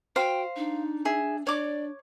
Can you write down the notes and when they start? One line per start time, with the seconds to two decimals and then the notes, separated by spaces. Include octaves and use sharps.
0.16 F#4 C5 F5 G5
0.56 D4 D#4
1.05 G#4 E5
1.47 D4 C#5 D5 D6